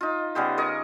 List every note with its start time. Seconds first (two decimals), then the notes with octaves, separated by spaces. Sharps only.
0.01 D#4 F4
0.35 C#3 G3 B3 C5
0.58 A#4 C#5 D#5